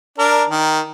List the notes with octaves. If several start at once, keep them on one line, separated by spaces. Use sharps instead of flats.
D4 A#4
D#3